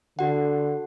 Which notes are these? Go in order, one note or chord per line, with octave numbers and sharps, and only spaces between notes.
D3 F#4 F#5